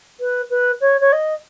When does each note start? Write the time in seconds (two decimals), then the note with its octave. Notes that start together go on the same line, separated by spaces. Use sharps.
0.20 B4
0.50 B4
0.81 C#5
1.01 C#5
1.12 D#5